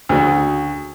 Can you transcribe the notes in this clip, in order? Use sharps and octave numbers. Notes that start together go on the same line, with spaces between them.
D2 C#3 F#4